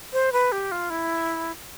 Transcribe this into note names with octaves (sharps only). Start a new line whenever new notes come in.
C5
B4
G4
F4
E4